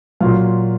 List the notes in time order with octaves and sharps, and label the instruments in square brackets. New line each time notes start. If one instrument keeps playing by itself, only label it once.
[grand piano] A#2 F#3 F4 F5